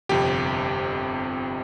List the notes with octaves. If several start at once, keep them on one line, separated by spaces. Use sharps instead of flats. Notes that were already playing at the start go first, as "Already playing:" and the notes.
G1 F2 C3 G4